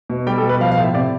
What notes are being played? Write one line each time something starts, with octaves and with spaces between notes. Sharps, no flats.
B2
G3 G5
A4
B2
B4
F3 F5
F5
A2
E5
C3 D5